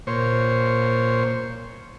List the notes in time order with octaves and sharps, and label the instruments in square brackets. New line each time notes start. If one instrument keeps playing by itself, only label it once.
[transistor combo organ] A#2 C5 C#5